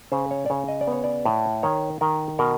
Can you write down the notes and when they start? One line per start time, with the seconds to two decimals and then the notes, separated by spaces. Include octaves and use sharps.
0.12 C#3 C5
0.31 C#5
0.46 D5
0.50 C#3 C#5
0.68 D#5
0.81 D5
0.87 B3 C#5
1.04 D5
1.25 A2
1.63 D#3 C#5
2.01 D#3 A#4
2.39 B2 A#4